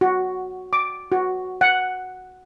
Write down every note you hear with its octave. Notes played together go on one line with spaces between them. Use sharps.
F#4
D6
F#4
F#5